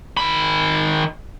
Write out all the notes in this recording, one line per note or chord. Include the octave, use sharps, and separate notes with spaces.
D#3 B5